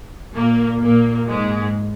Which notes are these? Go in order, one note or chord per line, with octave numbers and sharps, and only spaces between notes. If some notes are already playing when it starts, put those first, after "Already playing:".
A#2 A#3
A#2 A#3
G#2 G#3